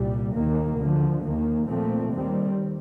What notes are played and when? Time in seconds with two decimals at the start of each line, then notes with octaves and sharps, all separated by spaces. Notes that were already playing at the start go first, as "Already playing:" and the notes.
Already playing: C2 A#2 G3
0.34 D#2 D#3 A#3
0.79 D2 D3 F3
1.24 D#2 D#3 A#3
1.68 A#2 F3 A3 C4
2.12 D#2 D#3 G3 C4